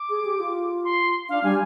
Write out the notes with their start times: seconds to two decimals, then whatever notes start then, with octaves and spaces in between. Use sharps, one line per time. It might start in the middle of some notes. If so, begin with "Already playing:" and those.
Already playing: D6
0.09 G#4
0.25 G4
0.39 F4
0.84 C6
1.29 D4 F5
1.44 G3 G#5